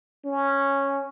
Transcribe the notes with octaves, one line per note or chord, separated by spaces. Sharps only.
C#4